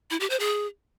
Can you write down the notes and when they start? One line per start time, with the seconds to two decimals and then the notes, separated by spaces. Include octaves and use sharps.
0.10 E4
0.20 G4
0.30 C5
0.39 G#4